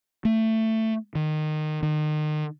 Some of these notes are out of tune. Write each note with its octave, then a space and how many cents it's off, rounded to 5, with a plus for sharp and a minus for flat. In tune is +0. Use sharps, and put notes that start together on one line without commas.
A3 +15
D#3 -20
D#3 -35